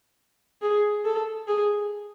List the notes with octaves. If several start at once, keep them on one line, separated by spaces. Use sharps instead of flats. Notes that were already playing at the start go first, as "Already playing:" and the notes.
G#4
A4
G#4